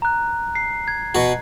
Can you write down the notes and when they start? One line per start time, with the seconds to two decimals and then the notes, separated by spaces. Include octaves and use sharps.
0.02 A#5 F#6
0.55 C7
0.88 G#6
1.15 B2 F#4